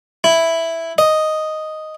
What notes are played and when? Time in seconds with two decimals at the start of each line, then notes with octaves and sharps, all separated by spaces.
0.24 E4
0.98 D#5